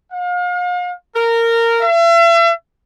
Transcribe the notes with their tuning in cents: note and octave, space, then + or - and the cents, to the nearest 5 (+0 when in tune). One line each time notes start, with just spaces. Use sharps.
F5 +40
A#4 -15
E5 +40